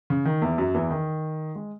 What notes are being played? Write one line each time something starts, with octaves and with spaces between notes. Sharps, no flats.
C#3
D#3
E2 E3
F#2 F#3
E2 E3
D#3
G#3